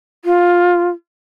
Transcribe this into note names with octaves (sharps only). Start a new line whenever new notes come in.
F4